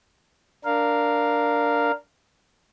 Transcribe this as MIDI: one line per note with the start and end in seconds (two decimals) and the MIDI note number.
0.65 1.91 62
0.65 1.91 70
0.65 1.91 77